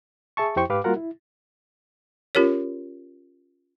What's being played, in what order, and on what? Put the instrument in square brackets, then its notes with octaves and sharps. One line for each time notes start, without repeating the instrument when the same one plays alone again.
[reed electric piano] G#4 E5 A5 C#6
F2 E4 G4 C5 G5 C#6
G#2 G4 B4 F5 D6
G3 A#3 F4 F#4 A#4 F#5
E4
[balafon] C#4 F4 G4 A#4 C#5